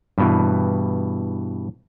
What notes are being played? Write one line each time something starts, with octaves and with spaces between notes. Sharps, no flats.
G2 B2 E3